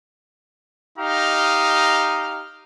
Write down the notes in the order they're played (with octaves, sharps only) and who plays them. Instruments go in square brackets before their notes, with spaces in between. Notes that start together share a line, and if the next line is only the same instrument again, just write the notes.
[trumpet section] D#4 G4 D#5 F5 A#5